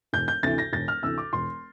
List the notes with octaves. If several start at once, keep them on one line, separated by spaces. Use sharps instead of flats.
E1 G6
G6
D2 C3 E3 A6
A#6
E1 A6
F6
D2 C3 E3 E6
D6
E1 C6